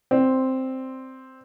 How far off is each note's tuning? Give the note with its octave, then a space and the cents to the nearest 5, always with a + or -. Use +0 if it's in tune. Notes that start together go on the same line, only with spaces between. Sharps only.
C4 +0 D5 +0